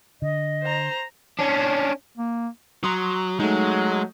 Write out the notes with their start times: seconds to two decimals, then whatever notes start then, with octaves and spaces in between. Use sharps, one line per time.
0.22 D3 D#5
0.62 C5 A#5
1.39 C#4 D4
2.17 A#3
2.84 F#3 A#5 C6 D#6
3.40 F#3 G#3 A3 D#4